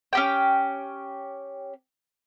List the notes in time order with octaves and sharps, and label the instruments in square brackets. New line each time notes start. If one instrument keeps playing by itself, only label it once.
[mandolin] C#4 G4 G5